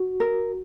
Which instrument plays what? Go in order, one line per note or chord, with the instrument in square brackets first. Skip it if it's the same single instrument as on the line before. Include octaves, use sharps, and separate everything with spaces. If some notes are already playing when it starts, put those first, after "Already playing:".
Already playing: [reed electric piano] F#4
[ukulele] A#4